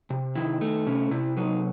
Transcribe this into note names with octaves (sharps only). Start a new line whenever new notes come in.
C3
D#3 E4
A3
C3 C#4
C3 E4
F#3 D#4